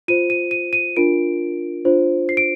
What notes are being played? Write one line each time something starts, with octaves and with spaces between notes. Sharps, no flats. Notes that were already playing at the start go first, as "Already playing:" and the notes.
F4 C5 D#7
D#7
D#7
D#7
D4 F4 A#4 D7
D4 F4 C5
C7
D7